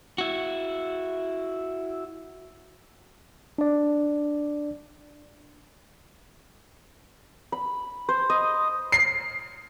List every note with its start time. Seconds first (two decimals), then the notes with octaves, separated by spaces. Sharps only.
0.18 E4 F#4
3.58 D4 D5
7.52 B5
8.09 C5
8.30 D#5
8.92 C7